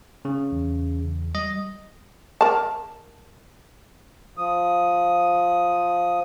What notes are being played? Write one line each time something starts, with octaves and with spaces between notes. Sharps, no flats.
C#3
E2
G3 D#5
A#4 A5
F3 D#6